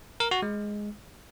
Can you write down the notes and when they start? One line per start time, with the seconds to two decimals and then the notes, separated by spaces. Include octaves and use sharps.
0.20 A#4
0.31 F#4
0.42 G#3